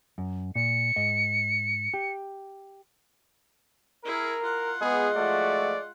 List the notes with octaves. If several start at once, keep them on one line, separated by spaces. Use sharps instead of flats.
F#2
A#2 C#7
G#2 D#5
G4
E4 G#4 A#4
F4 F#5
G#3 B3 G#4
F3 A3 F#4 D5